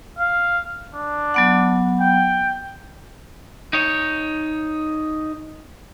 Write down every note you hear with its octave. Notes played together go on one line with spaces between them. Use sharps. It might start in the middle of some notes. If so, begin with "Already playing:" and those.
F5
D4
F#3 B3 F#5
G5
D#4 C#5